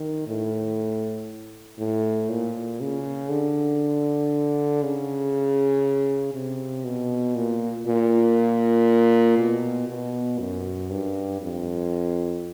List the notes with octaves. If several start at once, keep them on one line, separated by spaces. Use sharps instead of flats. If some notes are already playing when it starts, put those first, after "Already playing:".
Already playing: D#3
A2
A2
A#2
C#3
D3
C#3
C3
B2
A#2
A#2
B2
B2
F#2
G2
F2